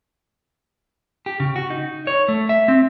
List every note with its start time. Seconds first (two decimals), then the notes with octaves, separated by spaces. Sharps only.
1.26 G4
1.40 C#3
1.56 F#4
1.70 D#4
2.07 C#5
2.28 A3
2.49 E5
2.68 C4